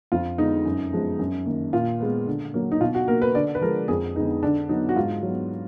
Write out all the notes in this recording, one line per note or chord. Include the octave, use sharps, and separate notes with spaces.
F2 F4
D3 G#3 B3 D#4
F#2
F3 G#3 B3
F#2
D#3 A#3
A#2 F4
G#3 B3
D3
F#3 A#3
D#4
B2 F4
F#4
A#3 A#4
B4
D3 D5
B4
F3 G#3 A#4
F2 G#4
D3 G#3 B3 D#4
D3 D4
F#3 B3 D#4
F#4
G#2 F4
F#3 B3